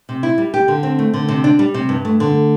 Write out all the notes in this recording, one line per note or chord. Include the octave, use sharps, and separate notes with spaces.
C3
E4
G3
G4
D3
C4
A3
D3
C3
D4
G3
C3
G2
A3
D3